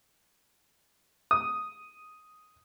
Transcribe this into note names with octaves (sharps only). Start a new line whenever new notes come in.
D#6